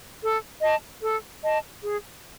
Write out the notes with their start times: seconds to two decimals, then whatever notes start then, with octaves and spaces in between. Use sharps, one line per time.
0.21 A4
0.62 D#5 A5
1.02 A4
1.43 D#5 A5
1.84 G#4